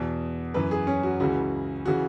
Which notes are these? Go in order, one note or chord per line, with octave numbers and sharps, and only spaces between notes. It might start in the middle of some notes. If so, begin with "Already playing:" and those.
Already playing: E2 B2
F#2 E3 B4
G#4
C#4
F#4
C#2 C#3 E3 F#4
C#3 E3 F#4